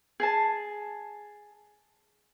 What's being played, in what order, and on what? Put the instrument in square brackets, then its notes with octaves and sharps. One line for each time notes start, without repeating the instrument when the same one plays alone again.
[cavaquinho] G#4 G#5 A5